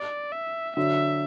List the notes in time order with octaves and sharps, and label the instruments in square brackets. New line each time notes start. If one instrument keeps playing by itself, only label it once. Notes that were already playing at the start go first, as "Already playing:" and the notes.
Already playing: [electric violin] D5
E5
[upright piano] D3 F#3 [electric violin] E5